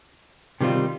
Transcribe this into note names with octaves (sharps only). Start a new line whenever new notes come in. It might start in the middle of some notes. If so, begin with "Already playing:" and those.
C3 D#3 G3 C4 F4